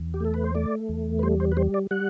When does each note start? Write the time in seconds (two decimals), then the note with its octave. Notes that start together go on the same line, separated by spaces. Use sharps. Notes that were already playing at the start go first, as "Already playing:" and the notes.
Already playing: E2
0.14 G4
0.20 A3 A4
0.34 B4
0.44 C5
0.55 A3 D5
0.89 E2
1.19 B4
1.23 G3 C5
1.40 C5
1.52 B4
1.57 G3 C5
1.74 D5
1.91 G3 F#5